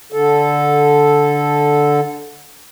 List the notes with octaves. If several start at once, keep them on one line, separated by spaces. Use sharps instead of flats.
D3 A4